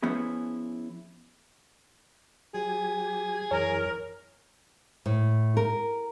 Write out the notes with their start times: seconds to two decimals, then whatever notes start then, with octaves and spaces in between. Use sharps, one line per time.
0.03 F3 B3 C#4 E4 G#4
2.54 F#3 G4 G#4 G#5
3.51 F#2 E3 A#4 C#5
5.06 A2
5.57 A#4